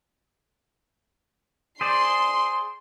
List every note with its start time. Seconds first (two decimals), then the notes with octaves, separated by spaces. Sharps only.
1.81 G#4 C5 D5 C6